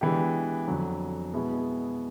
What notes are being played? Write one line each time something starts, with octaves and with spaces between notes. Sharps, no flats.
E3 G#3 B3 D4 G4
F2 D3 F#3
B2 G#3 B3 E4 G#4